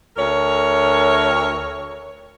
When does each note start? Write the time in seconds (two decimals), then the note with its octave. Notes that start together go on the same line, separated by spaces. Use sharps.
0.17 D2 A#4 C#5